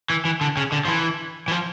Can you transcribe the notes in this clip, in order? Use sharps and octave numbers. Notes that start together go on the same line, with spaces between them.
E3
E3
D3
C#3
D3
F3
E3
E3
F3